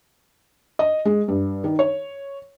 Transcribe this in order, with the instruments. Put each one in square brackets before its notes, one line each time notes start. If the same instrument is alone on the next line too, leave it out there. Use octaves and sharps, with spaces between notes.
[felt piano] D#5
G#3
G2
D#3
C#5